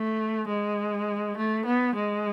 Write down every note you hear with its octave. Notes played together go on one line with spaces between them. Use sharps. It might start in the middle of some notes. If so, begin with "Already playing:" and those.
Already playing: A3
G#3
A3
B3
G#3